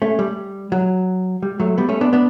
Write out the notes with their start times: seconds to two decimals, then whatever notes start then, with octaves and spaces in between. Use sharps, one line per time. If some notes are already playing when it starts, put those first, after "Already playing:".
0.02 A3 C#4
0.19 G3
0.72 F#3
1.43 G3
1.60 F#3 A3
1.78 G3 B3
1.89 A3 C#4
2.01 B3 D4
2.13 B3 D4